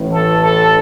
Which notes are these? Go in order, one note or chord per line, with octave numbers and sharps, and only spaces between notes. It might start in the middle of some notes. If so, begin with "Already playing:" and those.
Already playing: A1 A2 E3
A4
A4